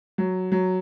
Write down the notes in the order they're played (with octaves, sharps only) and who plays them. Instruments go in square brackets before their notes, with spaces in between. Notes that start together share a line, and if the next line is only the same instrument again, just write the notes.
[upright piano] F#3
F#3